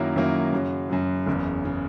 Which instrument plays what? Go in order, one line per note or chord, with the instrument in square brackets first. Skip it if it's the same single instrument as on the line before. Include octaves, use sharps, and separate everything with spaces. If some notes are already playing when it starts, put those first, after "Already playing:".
Already playing: [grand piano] F#2 D#3 F#3 A#3 E4
F#2 D#3 F#3 A#3 E4
F#2 C#3 F#3
F#2 C#3 F#3
F#1 E2 C#3
C#3